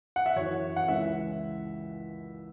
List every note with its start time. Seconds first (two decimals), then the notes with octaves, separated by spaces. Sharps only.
0.16 F#5
0.26 E5
0.36 F#2 E3 C#5
0.76 F#5
0.88 C#2 C#3 E3 E5